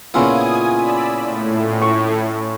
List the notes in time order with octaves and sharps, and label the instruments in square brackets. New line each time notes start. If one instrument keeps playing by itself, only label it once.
[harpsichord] A#2 C#3 B3 [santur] C#4 E4 F4 [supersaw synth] G#5 D#6
[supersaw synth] D5 B5 E6
A2
[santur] C#6